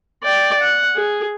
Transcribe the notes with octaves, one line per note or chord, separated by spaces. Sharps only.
D5 G5
F#5
G#4